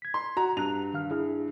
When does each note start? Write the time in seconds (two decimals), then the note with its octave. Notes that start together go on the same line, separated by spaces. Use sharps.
0.02 G#6 B6
0.14 C6
0.36 F#4 A#5
0.57 G2 A5 A#5 F#6 F7
0.94 D#3 F5 F6
1.11 E4 G#4